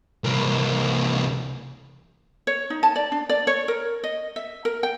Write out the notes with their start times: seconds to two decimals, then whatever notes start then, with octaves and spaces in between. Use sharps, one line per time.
0.24 C2 A#3
2.47 C#5
2.70 D#4
2.83 A5
2.96 D5
3.12 D4
3.29 D5
3.47 C#5
3.68 A#4
4.04 D#5
4.36 E5
4.65 A#4
4.83 G5